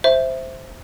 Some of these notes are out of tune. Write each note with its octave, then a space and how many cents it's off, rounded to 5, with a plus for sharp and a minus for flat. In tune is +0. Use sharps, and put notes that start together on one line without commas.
C5 +0 E5 +0